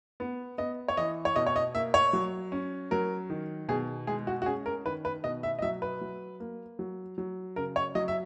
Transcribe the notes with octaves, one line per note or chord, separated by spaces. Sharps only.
B3
B3 D#5
C#5
E3 D#5
C#5
B2 D#5
C#5
D#5
A#3 E5
C#5
F#3
C#4
F#3 A#4
D#3
B2 G#4
G#3 G#4
F#4
F#4
C#4 G#4
A#4
D#3 B4
B4
B2 D#5
E5
D#5
F#3 E5
B4
F#3
A#3
F#3
F#3
C#3 A#4
C#5
F#3 D#5
E5